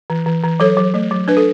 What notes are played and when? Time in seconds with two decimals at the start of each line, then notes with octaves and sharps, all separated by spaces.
0.10 E3
0.26 E3
0.44 E3
0.60 F#3 A4 C#5
0.77 F#3
0.94 A3
1.11 F#3
1.28 D4 B4
1.37 A4